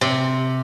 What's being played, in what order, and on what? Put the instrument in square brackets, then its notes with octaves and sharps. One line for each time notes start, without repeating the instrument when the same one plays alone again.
[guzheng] C3